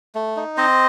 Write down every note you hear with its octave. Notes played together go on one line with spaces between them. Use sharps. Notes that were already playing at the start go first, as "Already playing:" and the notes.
A3
D#4
C4 C5 D#5